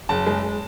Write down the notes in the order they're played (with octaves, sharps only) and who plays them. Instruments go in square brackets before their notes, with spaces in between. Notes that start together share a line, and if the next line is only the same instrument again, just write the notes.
[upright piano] F#1 A5
G#3